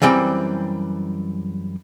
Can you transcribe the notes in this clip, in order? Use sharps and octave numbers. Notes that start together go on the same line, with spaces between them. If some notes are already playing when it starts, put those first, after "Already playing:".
F#2 E3 G3 C4 G5